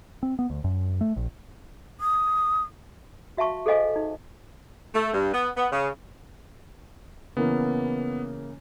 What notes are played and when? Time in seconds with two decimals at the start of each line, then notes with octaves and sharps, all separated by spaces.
0.23 C4
0.39 B3
0.50 D2
0.64 F#2
1.01 A3
1.16 A#1
2.01 D#6
3.37 F#4 E5 F5 A5 C#6
3.66 G#4 A4 C5 D#5 F5 G#5
3.96 D#4
4.94 A3
5.14 G2
5.33 B3
5.56 B3
5.72 C#3
7.37 C#3 E3 A#3 B3